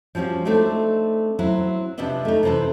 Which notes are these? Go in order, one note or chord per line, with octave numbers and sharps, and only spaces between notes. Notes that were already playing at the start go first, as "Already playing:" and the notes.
F3 G3 C4 C#4 F#4
A3 C4 D4 D#4 F#4
F#3 C4 E4 F#4
C3 F3 D4 B4 D#5 E5
A3 D#4
C3 E3 C4 A4 B4